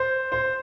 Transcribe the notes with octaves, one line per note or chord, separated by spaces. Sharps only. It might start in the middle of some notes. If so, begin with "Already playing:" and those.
Already playing: C5
C5